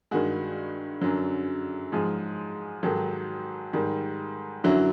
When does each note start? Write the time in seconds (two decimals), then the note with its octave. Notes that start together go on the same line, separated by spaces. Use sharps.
0.11 G2 D#3 G#3 F#4 G#4
1.01 F#2 D3 F#3
1.92 G#2 F3 G#3
2.83 G#2 D#3 F#3 G4 A4
3.73 G#2 D#3 G3
4.64 F#2 D3 F#3 E4 F#4